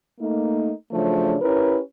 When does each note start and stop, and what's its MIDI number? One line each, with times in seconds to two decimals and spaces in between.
0.20 0.71 57
0.20 0.71 58
0.20 0.71 63
0.91 1.36 49
0.91 1.36 53
0.91 1.36 54
0.91 1.36 57
0.91 1.36 62
0.91 1.36 73
1.42 1.79 61
1.42 1.79 64
1.42 1.79 67
1.42 1.79 70
1.42 1.79 71
1.42 1.79 73